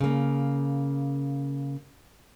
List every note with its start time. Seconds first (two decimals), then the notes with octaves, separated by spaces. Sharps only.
0.01 C#3 A#3